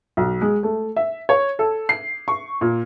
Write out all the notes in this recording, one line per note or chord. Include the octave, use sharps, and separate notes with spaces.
B1
G#3
A3
E5
C#5
A4
C7
C#6
A#2